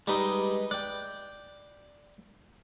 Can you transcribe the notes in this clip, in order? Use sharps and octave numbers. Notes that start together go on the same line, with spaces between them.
G3 G#3 D#4 B4 D#5
D5 G5 F#6 G6